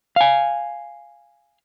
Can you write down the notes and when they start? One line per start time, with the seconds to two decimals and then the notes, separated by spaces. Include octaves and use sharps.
0.16 F5 G#5